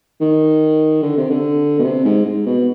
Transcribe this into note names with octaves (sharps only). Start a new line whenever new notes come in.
D#3
D3
C3
D3
B2
C3
G#2
G#2
B2